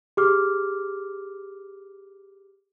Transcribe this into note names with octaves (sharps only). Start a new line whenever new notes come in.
G4 G#4 D6 F6